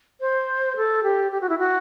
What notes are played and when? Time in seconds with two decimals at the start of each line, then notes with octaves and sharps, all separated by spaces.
0.21 C5
0.77 A4
1.03 G4
1.32 G4
1.41 F#4
1.49 E4
1.59 F#4